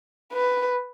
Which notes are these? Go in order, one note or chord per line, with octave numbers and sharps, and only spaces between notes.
B4